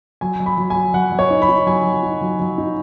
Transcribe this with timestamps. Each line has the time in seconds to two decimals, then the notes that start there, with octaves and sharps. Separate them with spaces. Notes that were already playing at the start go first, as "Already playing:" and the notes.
0.21 F#3 G#5
0.40 F#3
0.46 B5
0.57 F#3
0.70 F#3 G#5
0.94 F#3 F#5
1.12 F#3
1.19 C#5
1.30 D#4
1.42 B5
1.49 D#4
1.66 F#3 G#5
1.84 F#3
2.03 D#4
2.21 F#3
2.39 F#3
2.58 D#4